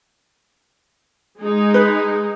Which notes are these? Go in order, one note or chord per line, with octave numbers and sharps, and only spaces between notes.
G#3 D#4
B4